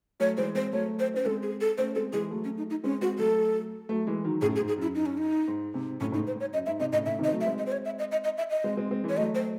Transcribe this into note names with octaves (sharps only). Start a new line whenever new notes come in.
F#3 A3 C#5
E3 G#3 C5
G#3 C4 C5
F#3 A3 C#5
C5
C#4 C5
G#3 C4 A4
G#4
A4
A3 C#4 C5
G#3 C4 A4
E3 G#3 G#4
F#3 A3
C#4
D#4
D#4
G#3 C4 C#4
G#3 C4 F#4
F#3 A3 A4
F#3 A3
E3 G#3
D#3 F#3
F#2 A2 G#4
G#4
G#2
G#4
F#2 E4
D#4
C#4
D#4
G#2
G#2 C3
F#2 A2 C#4
A2 D#4
G#2
C5
G#2
C#5
F#2 D#5
G#2 E5
G#2 C3 D#5
A2 C#3 D#5
A2 C#3 E5
C3 D#3
D#5
C4
F#3 A3
E5
G#3 C4
D#5
C5
C#5
E5
D#5
D#5
D#5
E5
D#5
G#3 C4
G#3 C4
G#3 C4
E3 G#3
C#5
F#3 A3 D#5
C5